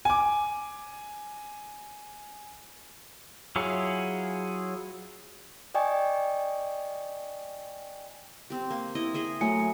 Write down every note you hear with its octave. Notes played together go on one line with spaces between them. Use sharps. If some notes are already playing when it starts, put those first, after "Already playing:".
G#5 D6
F#3 E4 F4 G#4 C#5
D5 D#5 G5 G#5 C#6
C4 G4
A#3
E4 D#5
G#4 D#5 E5
F#3 A3 G#5 C#7